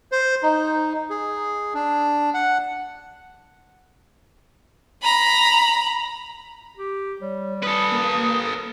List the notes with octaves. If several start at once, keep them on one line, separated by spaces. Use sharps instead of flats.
C5
D#4
G#4
D4
F#5
A#5 B5
G4
G3 C#5
A4 B4 D#6
A#3